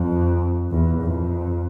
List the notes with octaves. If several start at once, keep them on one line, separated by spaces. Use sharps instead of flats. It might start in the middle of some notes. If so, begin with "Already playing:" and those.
Already playing: F2
E2
F2